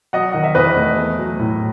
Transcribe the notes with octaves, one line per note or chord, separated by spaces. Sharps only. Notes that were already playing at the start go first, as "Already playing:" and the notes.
F#3 D#5 F#5
D#3 F#5
E5
E2 B4 D#5
A3
A3
F#3
A2